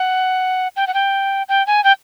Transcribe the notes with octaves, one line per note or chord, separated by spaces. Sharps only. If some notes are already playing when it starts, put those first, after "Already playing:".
Already playing: F#5
G5
F#5
G5
G5
G#5
G5